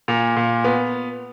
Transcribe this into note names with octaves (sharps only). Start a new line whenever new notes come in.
A#2
A#2
B3